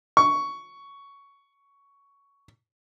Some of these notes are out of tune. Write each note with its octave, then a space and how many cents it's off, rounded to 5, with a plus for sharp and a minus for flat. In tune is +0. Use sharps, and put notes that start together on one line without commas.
C#6 +10